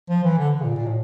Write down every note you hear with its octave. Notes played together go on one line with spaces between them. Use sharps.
F3
E3
D3
C#3
A#2
A#2
A2